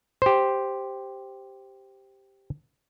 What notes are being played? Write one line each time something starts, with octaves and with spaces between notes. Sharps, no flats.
G4 C5